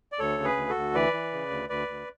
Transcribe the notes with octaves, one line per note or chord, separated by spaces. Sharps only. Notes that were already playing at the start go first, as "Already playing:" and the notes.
D5
D2 A4 C#5
C#3
G#4 B4
D2
F#4 A4
D2
E3 B4 D5
E3
C#3
D2
D2 B4 D5
D2